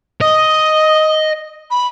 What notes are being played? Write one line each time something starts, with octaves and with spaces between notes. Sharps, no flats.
D#5 D#6
B5